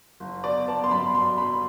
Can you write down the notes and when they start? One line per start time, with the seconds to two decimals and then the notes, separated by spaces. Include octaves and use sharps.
0.20 F#1
0.44 B3 D5
0.68 B3 A5
0.84 C6
0.91 F#2 B5
1.15 F#2 C6
1.38 F#1 B5